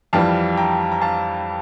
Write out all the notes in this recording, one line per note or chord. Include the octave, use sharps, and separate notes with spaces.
F2 E3 G3 F5 A5
G5 A#5
A#5
F5 A5